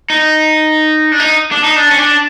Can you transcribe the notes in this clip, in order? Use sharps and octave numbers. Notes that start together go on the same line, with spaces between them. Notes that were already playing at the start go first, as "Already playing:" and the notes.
D#4
D4
D#4
D4
D#4
D4
C#4
D4